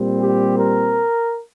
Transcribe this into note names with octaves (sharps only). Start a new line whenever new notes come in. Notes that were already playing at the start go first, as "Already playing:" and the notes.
Already playing: A#2 G3 C4
G4
A#4